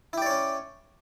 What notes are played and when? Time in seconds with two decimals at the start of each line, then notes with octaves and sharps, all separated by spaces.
0.13 E4
0.18 G4
0.22 D5
0.26 C#5
0.30 C#4